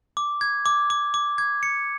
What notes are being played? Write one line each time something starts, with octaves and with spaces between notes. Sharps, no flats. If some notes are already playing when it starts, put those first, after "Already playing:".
D6
G#6
D6
D6
D6
G#6
C#7